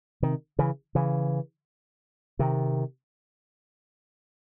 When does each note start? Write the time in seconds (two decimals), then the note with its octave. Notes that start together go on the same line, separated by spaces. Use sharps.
0.22 C3 D#3
0.59 C#3 E3
0.95 C#3 E3
2.39 C3 D#3